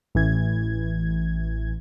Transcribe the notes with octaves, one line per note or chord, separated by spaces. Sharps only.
A1 E3 G#6